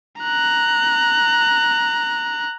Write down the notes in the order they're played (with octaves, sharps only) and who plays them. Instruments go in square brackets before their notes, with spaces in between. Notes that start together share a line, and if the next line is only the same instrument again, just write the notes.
[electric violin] A#5 F#6